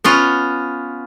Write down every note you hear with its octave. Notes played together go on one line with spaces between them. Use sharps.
B3 C#4 F4